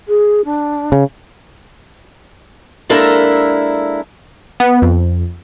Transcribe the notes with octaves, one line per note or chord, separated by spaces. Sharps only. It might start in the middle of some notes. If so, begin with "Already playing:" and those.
G#4
D4
C#3
G#3 A#3 D4 E4 A4 A#4
B3
F2